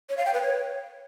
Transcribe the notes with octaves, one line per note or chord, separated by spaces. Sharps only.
C#5
F5
G5
B4
C#5